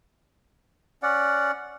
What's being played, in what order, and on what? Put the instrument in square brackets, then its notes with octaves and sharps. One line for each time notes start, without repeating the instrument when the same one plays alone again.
[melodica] C#4 D5 F#5